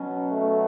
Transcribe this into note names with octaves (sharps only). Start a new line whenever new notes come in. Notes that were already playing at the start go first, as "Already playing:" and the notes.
Already playing: B2 F#3 C#4
A3